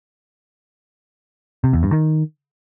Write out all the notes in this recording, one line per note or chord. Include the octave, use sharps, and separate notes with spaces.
C3
E2
G2
D#3